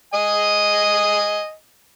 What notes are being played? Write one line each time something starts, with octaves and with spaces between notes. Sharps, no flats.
D#5 G#5